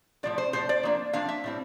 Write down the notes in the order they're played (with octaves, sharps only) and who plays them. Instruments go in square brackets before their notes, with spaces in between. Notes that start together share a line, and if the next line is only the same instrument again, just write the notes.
[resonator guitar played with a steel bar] A2 F3 A3 D5
C5
A2 F3 A3 C5
D5
F3 A#3 D4
F3 A#3 D4 F5
E5
A2 G3 C4 E4